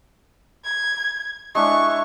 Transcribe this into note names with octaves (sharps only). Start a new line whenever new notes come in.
G#6
G#3 D4 E4 C#6